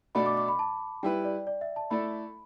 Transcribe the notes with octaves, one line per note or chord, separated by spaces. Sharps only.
B2 A3 D4 A4 D5 B5
D6
D6
B5
A5
G3 E4 B4 G5
D5
D5
E5
A5
A3 E4 A4 D5 B5